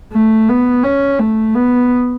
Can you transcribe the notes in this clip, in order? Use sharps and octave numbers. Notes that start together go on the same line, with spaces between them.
A3
B3
C#4
A3
B3